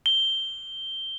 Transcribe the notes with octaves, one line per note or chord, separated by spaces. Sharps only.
G7